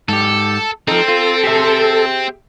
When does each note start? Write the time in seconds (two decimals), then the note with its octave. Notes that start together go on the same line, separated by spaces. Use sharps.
0.09 G#2 G4 A4
0.88 F3 C4 D#4 A4
1.08 F4
1.44 G4 G#4 E5